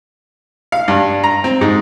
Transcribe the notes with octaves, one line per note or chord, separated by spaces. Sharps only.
F5
G2
A#5
C4
G#2